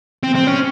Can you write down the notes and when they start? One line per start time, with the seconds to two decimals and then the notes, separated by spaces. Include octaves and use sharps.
0.23 C4
0.35 C4
0.47 C#4